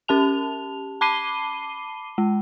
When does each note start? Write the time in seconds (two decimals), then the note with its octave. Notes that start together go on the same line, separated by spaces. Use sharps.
0.08 C#4 G4 A5 F7
1.01 A5 B5 D6 C7 D#7 G7
2.18 G#3